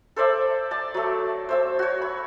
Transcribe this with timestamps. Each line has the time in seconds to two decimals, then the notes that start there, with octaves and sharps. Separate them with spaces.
0.16 A4 C5 D5 E5
0.71 D5 A5
0.94 F#3 A3
1.49 C5 E5 A5
1.79 F#4 C#5
2.01 B5 C#6